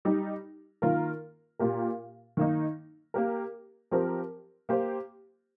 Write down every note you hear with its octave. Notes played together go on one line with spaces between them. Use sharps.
G3 D#4 G4
D#3 A#3 F4 A#4
A#2 A#3 G4 A#4
D#3 A#3 D#4
A#3 G4 A#4
F3 C4 G4 A#4
A#3 G4 C5